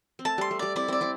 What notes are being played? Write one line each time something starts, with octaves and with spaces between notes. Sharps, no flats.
C4
A3 A5
G3 C6
A3
G3 D5
C4 E4 D5
C4 E4 D5
C4 E4